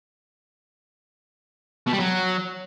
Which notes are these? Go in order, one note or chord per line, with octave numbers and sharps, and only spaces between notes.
B2
G3
F#3